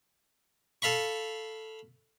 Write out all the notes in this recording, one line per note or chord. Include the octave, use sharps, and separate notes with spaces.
A4 F5 B5 C#6